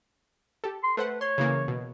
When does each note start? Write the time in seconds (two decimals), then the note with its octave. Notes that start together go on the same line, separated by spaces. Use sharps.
0.64 G4 A4
0.84 C6
0.97 A3 B4 C5 F#5
1.21 C#5 C6
1.38 C#3 E3 A#3
1.68 B2